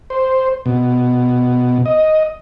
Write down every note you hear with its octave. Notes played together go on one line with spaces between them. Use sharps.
C5
B2
D#5